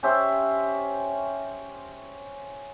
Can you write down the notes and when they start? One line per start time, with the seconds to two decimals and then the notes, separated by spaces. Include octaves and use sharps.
0.03 C#4 G4 C5 E5